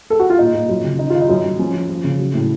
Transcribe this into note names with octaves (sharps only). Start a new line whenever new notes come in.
A4
F#4
F4
A#2 D#4
A#2
F#2
C#3
D#3 D#4
D#3 F4
D#4
F#2
F#2
F3 C#4
F3
F3
C#3
F#3
A2